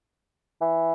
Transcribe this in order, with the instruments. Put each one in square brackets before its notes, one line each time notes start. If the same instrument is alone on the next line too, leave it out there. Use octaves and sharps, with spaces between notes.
[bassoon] E3